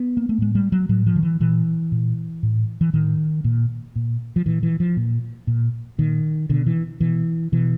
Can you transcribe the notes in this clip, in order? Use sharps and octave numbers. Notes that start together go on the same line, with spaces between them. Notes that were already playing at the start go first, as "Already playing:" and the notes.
Already playing: B3
A#3
A3
A2 G#3
G3
F#3
A2 F#3
F3
D#3
E3
A#2 E3
A#2
A2
E3
A2 D#3
A#2
A#2
F3
A#2 E3
E3
F3
A#2
A#2
A#2 D#3
B2 D3
E3
B2 E3
B2 E3